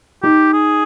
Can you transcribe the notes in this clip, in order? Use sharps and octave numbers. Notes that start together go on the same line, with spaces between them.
D#4 G4
G#4